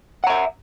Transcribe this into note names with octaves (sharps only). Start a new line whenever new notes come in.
E5 F#5 A#5